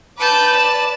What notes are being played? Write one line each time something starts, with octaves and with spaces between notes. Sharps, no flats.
B4 A5 D6 G6
D5 E7